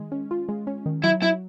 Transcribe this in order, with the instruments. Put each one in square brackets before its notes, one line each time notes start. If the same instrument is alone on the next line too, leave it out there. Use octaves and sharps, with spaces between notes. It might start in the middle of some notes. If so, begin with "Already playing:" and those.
Already playing: [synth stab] D#3 G#3
C#4
F4
G#3
C#4
D#3
[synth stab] F#3 [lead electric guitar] E4
[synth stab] F#3 [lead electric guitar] E4